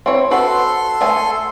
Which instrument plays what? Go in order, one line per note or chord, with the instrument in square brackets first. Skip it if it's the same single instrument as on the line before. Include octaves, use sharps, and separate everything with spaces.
[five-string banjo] C4 E4 C#5
[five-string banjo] F#4 B4 C5 [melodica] A4 C6
[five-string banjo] A3 G#4 G#5